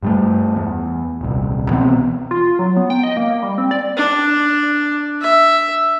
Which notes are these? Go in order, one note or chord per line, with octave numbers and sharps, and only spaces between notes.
G2 G3 A3
E2
D#1 C2
B2 E3 B3 C4
F4
F#3
B3
G5
D#5
A#3
A#3
G3
C4
D5
D4
E5